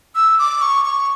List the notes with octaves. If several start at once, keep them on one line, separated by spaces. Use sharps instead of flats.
E6
D6
C#6
C#6